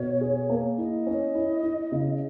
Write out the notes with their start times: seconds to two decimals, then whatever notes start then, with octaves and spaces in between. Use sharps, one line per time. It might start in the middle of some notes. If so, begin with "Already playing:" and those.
Already playing: B2 C#5
0.21 G#4
0.50 A#3
0.78 E4 D#5
1.07 C#4
1.35 E4
1.63 E4
1.92 C#3